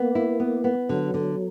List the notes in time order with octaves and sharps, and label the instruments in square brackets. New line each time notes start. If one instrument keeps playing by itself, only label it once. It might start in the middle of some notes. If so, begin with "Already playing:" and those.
Already playing: [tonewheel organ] A#3 [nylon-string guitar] B3
[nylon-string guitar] E4
B3
B3
[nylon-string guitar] D3 [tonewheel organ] F#3
[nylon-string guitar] D3